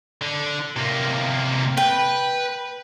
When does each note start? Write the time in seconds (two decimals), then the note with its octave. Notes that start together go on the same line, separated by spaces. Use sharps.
0.22 D3
0.77 C3 A#3
1.77 B4 G5